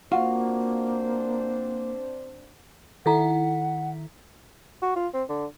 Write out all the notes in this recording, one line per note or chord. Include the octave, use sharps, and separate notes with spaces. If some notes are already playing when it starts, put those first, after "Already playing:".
A#3 C4 D4 F4 F#4 C5 F5 F#5
D#3 E4 A4 F#5 A#5
F#4
F4
C4
D3